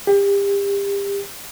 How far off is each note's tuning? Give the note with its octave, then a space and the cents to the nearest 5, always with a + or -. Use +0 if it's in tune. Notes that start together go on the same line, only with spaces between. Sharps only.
G4 +30